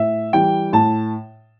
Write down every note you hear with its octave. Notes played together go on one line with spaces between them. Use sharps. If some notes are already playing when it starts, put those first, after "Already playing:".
Already playing: A2 E5
E3 G3 G5
A2 A5